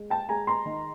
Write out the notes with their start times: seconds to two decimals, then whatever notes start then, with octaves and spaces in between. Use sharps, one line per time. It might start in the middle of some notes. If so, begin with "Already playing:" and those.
Already playing: G#3
0.10 G5 A5
0.29 G#3 G#5 A#5
0.47 A#5 C6
0.66 D#3